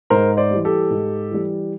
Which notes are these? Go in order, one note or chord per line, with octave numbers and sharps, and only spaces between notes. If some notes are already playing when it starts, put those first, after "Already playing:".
G#2 A#4 C5
C5 D5
E3 G3
G4 A4
G#2
E3 G3